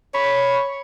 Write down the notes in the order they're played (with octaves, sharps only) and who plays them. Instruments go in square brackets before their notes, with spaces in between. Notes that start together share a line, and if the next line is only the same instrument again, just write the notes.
[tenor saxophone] C#5 [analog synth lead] B5